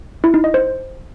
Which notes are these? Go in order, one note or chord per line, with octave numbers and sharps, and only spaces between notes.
E4
D#4
D#5
C5